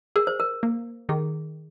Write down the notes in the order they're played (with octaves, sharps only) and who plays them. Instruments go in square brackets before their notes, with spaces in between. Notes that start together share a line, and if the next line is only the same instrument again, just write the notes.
[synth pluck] G#4 [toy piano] A#4
[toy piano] C5
A#4
[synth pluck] A#3
[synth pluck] D#3 [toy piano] G#4